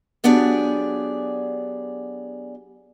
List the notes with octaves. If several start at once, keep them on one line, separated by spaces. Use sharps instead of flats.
F#3 B3 D4 G4 G#4 D5